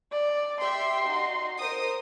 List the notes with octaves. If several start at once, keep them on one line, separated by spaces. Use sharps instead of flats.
D5
G4 E5 G5 C6
D#4 F#4
A#4 C5 D#6